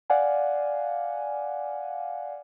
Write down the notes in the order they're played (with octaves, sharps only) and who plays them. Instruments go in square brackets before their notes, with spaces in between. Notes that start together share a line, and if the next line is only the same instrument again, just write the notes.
[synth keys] D5 F5 F#5 G#5